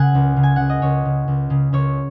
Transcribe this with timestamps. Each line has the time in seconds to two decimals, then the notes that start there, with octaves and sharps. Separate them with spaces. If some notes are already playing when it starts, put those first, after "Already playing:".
Already playing: C#3 F#5 G#5
0.15 C#2
0.36 C#3
0.43 G#5
0.56 C#3 F#5
0.69 D#5
0.82 C#2 C#5
1.05 C#3
1.28 C#2
1.50 C#3
1.73 C#2 C#5